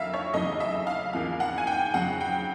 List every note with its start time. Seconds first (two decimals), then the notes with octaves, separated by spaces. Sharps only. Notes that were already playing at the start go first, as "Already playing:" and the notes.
Already playing: F2 D3 F#3 A#3 E5 F5
0.14 C#5
0.34 E2 C#3 F#3 A3 D#5
0.60 E5
0.87 F5
1.13 E2 C#3 F3 A#3 F5
1.40 F#5
1.58 G#5
1.67 G5
1.94 F2 C#3 F#3 F#5
2.21 G5